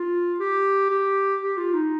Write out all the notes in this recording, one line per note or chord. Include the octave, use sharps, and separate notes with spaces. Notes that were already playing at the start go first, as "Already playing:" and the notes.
Already playing: F4
G4
G4
G4
F4
D#4